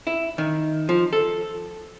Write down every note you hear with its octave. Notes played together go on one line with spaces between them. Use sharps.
E4
D#3
F3
A4